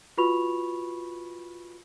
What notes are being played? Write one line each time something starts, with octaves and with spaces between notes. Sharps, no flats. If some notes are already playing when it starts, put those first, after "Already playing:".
F4 F#4 B4 B5 C#6 F7